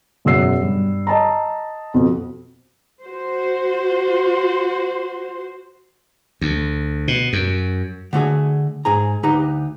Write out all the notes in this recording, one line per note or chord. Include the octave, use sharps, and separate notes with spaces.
E1 F#2 F#5 E6 C7
G2
D#5 A5 A#5
F2 B2
F#4 C5
D2
B2
F#2
D3 A3 F#4 G#4
G#2 G#4 A#5
D2 D#4 G4 B4 A#5